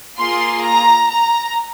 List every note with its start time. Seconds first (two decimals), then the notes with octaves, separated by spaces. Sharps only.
0.17 A#3 F4 G#4 C6
0.64 A#5
1.10 A#5